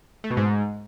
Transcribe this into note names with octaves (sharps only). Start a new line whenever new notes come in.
A3
B2
G#2